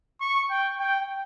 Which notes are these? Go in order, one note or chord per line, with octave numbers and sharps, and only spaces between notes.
C#6
G5
G5